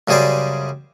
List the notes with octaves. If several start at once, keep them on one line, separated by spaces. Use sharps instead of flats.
F#2 C#3 G3 G#4 C5 D5